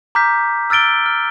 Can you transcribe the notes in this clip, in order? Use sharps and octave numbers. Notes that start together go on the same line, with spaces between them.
A#5 D6 F6 G6 B6
E6 F6 A6 D7 G7
F6